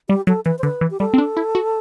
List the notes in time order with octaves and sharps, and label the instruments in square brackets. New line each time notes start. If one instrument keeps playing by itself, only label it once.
[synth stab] G3 [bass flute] G4
[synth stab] F#3 [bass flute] A4
[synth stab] E3 [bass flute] B4
[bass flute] C5
[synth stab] D3 [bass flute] B4
[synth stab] E3
[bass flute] G4
[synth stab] G3 [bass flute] A4
[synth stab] C4
D4
E4
F#4